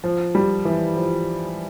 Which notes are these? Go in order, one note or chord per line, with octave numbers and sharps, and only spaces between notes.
F3
G3
E3
F3